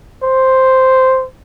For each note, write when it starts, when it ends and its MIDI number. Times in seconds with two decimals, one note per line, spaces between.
0.23 1.26 72